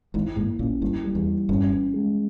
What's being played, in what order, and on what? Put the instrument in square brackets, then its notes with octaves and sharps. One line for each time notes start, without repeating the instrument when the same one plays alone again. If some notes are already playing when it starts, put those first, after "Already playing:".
[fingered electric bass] G#1 G#2 [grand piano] E4
[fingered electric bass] G#1 G#2 [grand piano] A#3
[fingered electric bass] A#1 A#2 [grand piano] C#4
[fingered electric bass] G1 G2 [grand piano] E4
[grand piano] G3
[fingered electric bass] E2
[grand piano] E3
[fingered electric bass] G1 G2 [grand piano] C#4
[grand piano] C#4
G#3